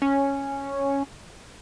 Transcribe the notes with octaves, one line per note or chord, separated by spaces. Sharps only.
C#4